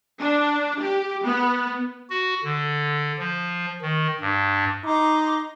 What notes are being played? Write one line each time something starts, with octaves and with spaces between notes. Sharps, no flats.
D4
G4
B3
F#4
D3
F3
D#3
G2
D#4 A#5 C6 D6